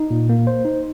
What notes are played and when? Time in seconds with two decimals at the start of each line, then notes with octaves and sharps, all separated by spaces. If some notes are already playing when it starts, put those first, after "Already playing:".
Already playing: D#4
0.11 A#2
0.29 A#3
0.47 C5
0.65 D#4